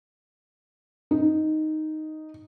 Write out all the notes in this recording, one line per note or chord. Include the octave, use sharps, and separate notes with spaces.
D#4